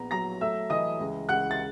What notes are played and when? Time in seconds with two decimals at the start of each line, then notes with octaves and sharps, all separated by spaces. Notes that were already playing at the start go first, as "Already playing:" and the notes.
Already playing: A#1 B3 A#5
0.11 F#3 A#5 A#6
0.41 A3 E5 E6
0.70 E3 D#5 D#6
1.00 C#2
1.29 C#2 F#5 F#6
1.51 A6